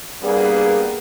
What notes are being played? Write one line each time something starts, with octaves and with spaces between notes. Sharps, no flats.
G2 G3 A#3 B3 G#4